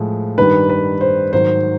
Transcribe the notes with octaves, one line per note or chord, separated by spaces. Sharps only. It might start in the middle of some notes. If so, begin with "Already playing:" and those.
Already playing: A2 F3 G#3
G2 D#3 G3 B4
B4
C5
G#2 D#3 F#3 C5